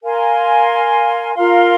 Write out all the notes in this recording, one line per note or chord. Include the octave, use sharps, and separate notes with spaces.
A#4 F5 G#5 C6
F4 A#4 F5 C6